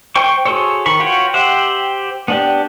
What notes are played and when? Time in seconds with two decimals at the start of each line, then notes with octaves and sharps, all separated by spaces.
0.16 C5 G5 C#6
0.45 F#4 G#4 A4 C5 C#5
0.86 D#3 B5 C#6
1.00 F4 F#4 B4 C#5 G5
1.34 G4 C5 E5 F#5
2.28 B3 D4 G4